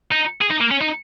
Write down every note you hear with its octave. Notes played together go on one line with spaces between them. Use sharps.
D#4
G#4
D#4
A#3
C#4
D#4